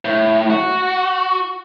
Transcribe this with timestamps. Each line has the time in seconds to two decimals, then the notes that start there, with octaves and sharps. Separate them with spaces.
0.05 A2
0.50 F#4